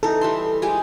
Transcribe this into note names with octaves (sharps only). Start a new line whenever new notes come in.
E3 D#4 A4
G3 E5 C6
G#3 G4 G#5